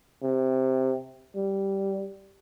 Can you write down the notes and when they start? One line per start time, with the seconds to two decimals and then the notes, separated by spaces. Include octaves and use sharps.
0.22 C3
1.35 G3